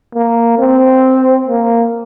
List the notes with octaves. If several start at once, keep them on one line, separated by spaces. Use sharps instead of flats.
A#3
C4
A#3